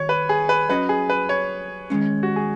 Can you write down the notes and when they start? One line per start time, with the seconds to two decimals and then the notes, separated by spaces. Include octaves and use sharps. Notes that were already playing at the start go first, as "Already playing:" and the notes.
Already playing: D#3 F#4 C#5
0.09 B4
0.29 G#4
0.49 B4
0.69 F#3 C#4 F#4 B4 D#5
0.89 G#4
1.10 B4
1.29 C#5
1.90 D#3 G#3 C#4
2.23 F#4
2.36 G#4